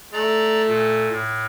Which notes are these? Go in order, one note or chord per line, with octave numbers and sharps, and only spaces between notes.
A3 D5 A#5
A#2
A2